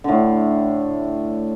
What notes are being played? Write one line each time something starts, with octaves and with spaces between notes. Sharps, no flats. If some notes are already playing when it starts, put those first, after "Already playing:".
A2 D3